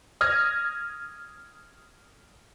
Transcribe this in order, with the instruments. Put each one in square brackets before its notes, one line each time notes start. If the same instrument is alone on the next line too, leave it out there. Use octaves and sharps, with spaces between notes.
[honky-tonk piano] D#6 F6 G#6 A#6